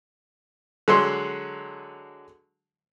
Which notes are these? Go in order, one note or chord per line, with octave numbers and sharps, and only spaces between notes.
D3 F#3 G#3 C6